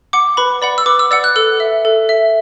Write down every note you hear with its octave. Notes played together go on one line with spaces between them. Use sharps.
F#5 D6
B4 B5
D5 F#5 B5
E6
B4 D6
E6
D5 F#5 E6
F#6
A4 E6
E5
A4
E5